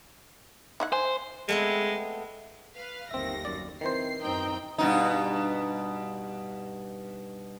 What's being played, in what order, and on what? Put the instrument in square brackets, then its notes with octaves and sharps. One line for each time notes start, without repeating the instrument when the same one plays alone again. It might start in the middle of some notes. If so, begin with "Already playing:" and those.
[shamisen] D#4 E4 F#5
[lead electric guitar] C5 [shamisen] G#5
[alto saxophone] G#3 [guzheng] A3 B3 C4
[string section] B4 F5
[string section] G1 D#2 A#6 [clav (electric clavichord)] C4 E5
[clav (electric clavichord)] F#2 D5
[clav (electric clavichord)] D#3 E3 C5 [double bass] C4 [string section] C7
[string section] F#2 C4 G5 [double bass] D#4
[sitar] G2 B2 D#4